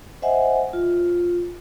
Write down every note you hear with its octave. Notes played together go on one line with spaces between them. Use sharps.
C5 D#5 E5 F#5 G#5
F4